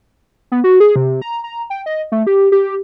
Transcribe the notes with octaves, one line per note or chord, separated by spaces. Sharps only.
B3
F#4
G#4
C3
A#5
A#5
G5
D#5
A3
G4
G4